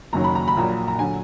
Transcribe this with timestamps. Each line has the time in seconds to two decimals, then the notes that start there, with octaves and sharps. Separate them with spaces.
0.13 F#1 F#2 D#3 F#3 A#5
0.24 B5
0.35 A#5
0.48 B5
0.57 A#1 A#2 F#3 A#5
0.88 A#5
0.99 D3 F#3 G#5